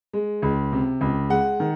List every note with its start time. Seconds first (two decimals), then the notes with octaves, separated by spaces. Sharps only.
0.13 G#3
0.42 C#2
0.72 C3
1.01 C#2
1.30 G#3 F#5
1.60 D#3